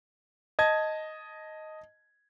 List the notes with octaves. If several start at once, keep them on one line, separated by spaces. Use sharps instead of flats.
D#5 A5 G#6